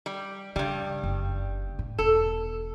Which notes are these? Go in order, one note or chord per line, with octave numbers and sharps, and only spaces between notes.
G3
G2 C#3 G3
F#1
A2
E1 A4